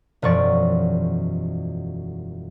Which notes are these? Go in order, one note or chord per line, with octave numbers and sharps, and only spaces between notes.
E1 F#2 F3 D5 C#6 A6